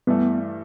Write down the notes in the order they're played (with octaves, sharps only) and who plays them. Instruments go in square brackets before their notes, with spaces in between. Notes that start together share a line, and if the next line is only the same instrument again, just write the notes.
[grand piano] G2 E3 A3 [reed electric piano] B3